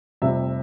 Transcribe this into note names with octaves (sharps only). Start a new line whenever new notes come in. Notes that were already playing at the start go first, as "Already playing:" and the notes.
F1 F2 C3 G3 E5